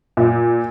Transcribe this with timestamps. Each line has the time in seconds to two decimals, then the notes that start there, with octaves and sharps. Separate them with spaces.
0.17 A#2